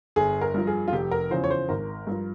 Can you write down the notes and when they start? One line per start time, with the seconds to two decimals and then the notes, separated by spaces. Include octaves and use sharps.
0.16 G1 G#4
0.41 A#4
0.54 G2 F3
0.67 G#4
0.88 F4
0.93 F1 G4
1.11 A#4
1.31 E2 C#3 F3 C5
1.44 C#5
1.50 C5
1.69 G#1 A#4
2.07 G2 F3